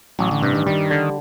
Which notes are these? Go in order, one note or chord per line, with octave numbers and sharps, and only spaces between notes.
A1 F#3
D3
G2 C3
D#3
D#3 G3
D3